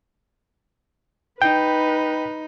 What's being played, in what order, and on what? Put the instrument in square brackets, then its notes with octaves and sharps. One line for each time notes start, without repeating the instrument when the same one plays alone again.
[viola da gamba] D#4 [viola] B4 [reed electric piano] G5